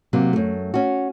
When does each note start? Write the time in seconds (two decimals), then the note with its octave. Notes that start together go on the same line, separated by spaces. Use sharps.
0.13 C3 F#3 A#3
0.33 F#2 A3
0.74 C#4 F#4